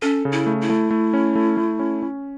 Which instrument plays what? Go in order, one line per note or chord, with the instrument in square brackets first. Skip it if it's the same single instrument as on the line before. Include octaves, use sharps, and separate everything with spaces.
[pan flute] C#4 [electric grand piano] A4
[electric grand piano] C#3
[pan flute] E4
[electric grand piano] A3
[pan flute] E4
[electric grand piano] A3
A3
C#4
A3
A3
C#4
C#4